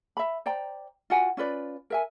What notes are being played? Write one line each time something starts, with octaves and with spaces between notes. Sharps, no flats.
E5 B5
C5 D5 G5 A#5
F4 F#4 F#5 G#5
C#4 F4 B4 D5
A#4 E5 G#5